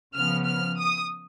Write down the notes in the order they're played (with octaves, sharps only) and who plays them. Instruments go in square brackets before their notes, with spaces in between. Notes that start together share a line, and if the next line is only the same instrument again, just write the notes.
[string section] C#3 F3 B3 F6
F6
D#6